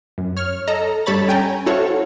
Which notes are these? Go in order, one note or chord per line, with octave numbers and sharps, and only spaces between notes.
F#2
C#5 F6
A4 D#5 A#5
G2 G3 A4 C#5 B5 A6
C#4 G5 G#5 A#5
E4 F#4 A4 C5 C#5 F5